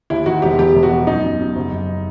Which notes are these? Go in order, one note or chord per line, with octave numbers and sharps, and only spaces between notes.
D#2 E4
D#3 F#4
E1 G4
E1 G4
E1
F#4
B2
F#2 D#4
F#2
F#2
F#1
F#1